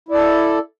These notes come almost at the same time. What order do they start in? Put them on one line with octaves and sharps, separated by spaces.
E4 D5 A4